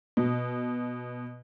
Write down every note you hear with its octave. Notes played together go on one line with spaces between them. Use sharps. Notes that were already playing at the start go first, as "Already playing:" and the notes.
B2